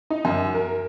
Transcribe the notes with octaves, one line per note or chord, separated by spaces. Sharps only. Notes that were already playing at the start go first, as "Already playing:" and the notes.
D#4
F#2
A#4